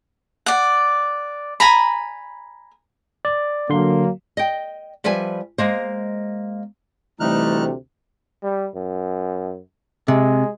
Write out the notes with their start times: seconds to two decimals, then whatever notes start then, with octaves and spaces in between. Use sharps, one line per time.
0.46 D5 F#5
1.60 G#5 A#5 B5
3.25 D5
3.70 D3 F#3 A#3 C6
4.37 D#5 G5
5.04 F3 G3 B4 E5 G#5
5.58 G#3 A#3 C5
7.20 D2 C3 E3 G3 A3 D#4 F6 F#6
8.43 G3
8.75 F#2
10.08 C3 G#3